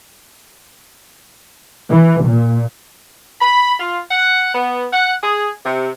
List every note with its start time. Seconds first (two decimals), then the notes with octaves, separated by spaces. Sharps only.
1.91 E3
2.24 A#2
3.40 B5
3.79 F4
4.09 F#5
4.54 B3
4.92 F#5
5.22 G#4
5.64 C3